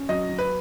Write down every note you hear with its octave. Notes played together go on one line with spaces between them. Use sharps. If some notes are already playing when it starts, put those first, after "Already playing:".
Already playing: C#4
F#3 D#5
F#3
B4